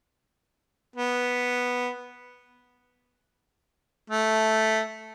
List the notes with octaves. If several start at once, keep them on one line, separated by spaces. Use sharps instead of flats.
B3
A3